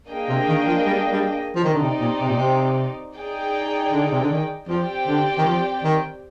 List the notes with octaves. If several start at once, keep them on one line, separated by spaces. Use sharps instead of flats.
A#3 D4 G#4 D#5 G5
C3
D#3
F3
G3
G3
F3
D#3 C4 D#4 G4 D5
D3
C3
A#2
C3
A#2
C3
D#4 G#4 D5 G5
D3
C3
D3
D#3
F3 C4 G4 D5 G5
D3
D#3
F3
D#3